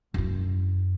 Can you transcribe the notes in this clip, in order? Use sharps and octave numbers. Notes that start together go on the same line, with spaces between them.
F#2 E4